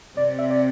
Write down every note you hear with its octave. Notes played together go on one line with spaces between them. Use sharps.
C3 D5
E5
D5